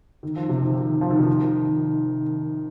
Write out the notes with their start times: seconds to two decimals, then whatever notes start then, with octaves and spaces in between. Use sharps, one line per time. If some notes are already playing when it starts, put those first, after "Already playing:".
0.23 D#3
0.36 F3
0.49 C3
0.62 D#3
0.76 D#3
1.01 F3
1.10 D#3
1.18 C3
1.28 D#3